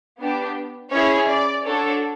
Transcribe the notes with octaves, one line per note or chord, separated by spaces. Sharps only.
B3 D4 G4
C#4 E4 G#4 C#5
D5
D4 F#4 A4 C#5